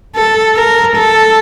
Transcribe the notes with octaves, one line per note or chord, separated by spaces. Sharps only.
A4
A#4
A4